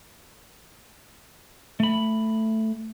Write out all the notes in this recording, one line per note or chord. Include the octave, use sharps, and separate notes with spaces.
A3 B5